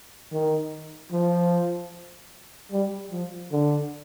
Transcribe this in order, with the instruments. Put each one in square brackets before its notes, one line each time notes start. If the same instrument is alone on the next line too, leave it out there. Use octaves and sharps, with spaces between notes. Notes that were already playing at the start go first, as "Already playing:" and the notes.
[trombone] D#3
F3
G3
F3
D3